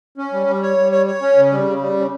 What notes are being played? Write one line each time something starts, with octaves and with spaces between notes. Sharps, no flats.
C#4
G3
G3
C#5
G3
C#5
C#5
C#4
C#3
G3
C#3
G3
C#3